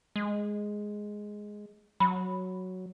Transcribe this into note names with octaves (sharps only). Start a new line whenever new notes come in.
G#3
F#3 B5